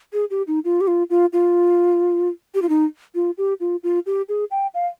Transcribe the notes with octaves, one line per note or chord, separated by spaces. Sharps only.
G#4
G4
D#4
F4
G4
F4
F4
F4
G4
F4
D#4
F4
G4
F4
F4
G4
G#4
G5
F5